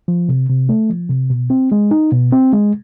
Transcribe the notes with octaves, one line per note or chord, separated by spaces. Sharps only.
F3
C3
C3
A3
F3
C3
B2
C4
G#3
D#4
B2
C4
G#3